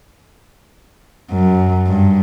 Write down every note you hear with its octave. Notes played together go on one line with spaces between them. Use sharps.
F#2
G2